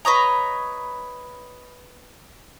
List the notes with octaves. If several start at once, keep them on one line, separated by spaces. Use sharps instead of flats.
B4 C#5 D#5 A#5